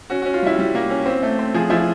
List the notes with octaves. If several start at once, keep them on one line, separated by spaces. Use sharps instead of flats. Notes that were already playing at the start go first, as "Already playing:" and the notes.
C#4 F#4
F#4
C#4
F4
G3 E4
G3
A#3
C#4
C4
A3
C4
F3 G#4
F3 E4